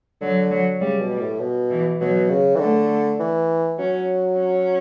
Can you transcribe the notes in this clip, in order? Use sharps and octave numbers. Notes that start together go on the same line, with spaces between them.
D3 F#3
F#3
C#3 G3
B2
G3
A2
B2
E3
B2 F#3
C#3
E3
D3 A3
E3
F#3 C#4
C#4